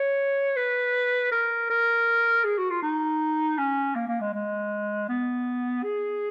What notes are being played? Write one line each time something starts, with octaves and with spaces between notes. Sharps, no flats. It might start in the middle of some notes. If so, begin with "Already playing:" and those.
Already playing: C#5
B4
A#4
A#4
G#4
F#4
F4
D#4
C#4
A#3
A#3
G#3
G#3
B3
G#4